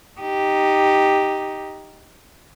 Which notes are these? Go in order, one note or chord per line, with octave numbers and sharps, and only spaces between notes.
D#4 G4